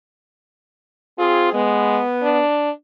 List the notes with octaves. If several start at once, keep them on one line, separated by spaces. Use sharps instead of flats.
C4 F4 G#4
G#3 B3
D4